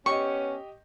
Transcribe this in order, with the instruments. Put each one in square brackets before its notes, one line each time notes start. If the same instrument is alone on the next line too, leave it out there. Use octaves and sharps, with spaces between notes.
[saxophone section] B3 C#4 [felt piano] G4 D#5 [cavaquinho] C#6